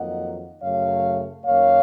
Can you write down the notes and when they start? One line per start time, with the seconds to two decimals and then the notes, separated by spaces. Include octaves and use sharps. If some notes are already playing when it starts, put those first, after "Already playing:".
Already playing: F2 D#3 F#3 A#3 D#5 F#5
0.62 F#2 C#3 F#3 A3 C#5 F5
1.45 F#2 D#3 A#3 C#5 F5